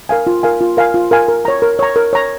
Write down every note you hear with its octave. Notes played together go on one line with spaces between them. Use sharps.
A#4 F5 G#5
F4
A#4 F5 G#5
F4
A#4 F5 G#5
F4
A#4 F5 G#5
A#4
C#5 A#5
A#4
C#5 A#5
A#4
C#5 A#5